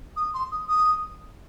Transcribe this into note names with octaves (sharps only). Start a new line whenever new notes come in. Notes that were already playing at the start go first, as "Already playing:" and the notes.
D#6
C6
D#6
D#6